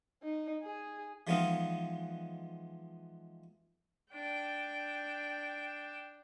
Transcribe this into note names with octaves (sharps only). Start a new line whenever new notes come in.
D#4
G#4
E3 F3 G#3 B3 D#4 F4
D4 G5